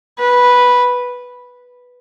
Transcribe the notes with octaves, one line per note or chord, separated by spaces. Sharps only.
B4